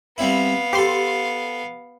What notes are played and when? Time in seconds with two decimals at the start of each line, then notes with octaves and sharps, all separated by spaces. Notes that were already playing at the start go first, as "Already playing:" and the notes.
0.18 G3 B3 C4 E4 F5
0.73 G4 A4 C5 C6